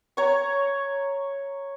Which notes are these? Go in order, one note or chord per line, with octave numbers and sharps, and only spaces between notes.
C#5 A#5 C#6